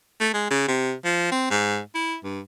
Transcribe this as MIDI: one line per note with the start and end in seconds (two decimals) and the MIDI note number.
0.20 0.32 57
0.34 0.46 56
0.51 0.68 49
0.68 0.93 48
1.05 1.30 53
1.32 1.46 60
1.50 1.79 44
1.95 2.17 64
2.24 2.41 43